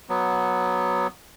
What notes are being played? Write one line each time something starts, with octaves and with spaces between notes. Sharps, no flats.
F#3 B3